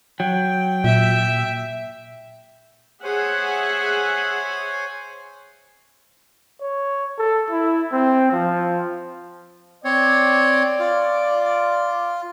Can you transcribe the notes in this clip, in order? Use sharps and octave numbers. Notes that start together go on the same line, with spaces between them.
F#3 G5
A#2 E5
G#4 C5 C#5 E5 F#5 G#5
C#5
A4
E4
C4
F3
C4 C#5 D5
F4